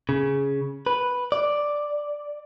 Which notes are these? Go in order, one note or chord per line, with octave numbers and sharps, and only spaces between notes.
C#3
B4
D5